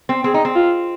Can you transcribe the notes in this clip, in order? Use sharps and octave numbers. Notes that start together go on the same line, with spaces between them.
C4
C4 G#4
D#4
C4
F4